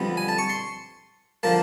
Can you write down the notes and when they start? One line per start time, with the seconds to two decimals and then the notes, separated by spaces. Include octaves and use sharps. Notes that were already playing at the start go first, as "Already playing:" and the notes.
Already playing: F2 D3 G3 B3
0.17 G#5
0.28 A5
0.38 C#6
0.49 C6
1.43 D3 F3 A#3 A5